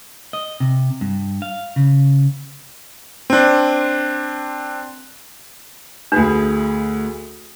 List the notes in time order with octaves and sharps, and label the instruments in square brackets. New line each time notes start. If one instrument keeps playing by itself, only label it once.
[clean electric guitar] D#5
C3
G2
F5
C#3
[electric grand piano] C4 D4
[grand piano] D2 G#4 B4 [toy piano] D4